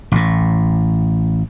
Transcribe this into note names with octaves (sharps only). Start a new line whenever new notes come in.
A1 A2